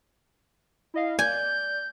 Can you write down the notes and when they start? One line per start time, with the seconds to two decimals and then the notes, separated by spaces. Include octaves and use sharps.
0.94 E4 D#5 F5
1.19 D5 G#5 G6